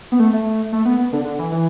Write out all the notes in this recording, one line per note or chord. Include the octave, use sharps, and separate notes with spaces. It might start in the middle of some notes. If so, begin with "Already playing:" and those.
B3
A3
A3
A3
B3
B3
D3
D3
E3
E3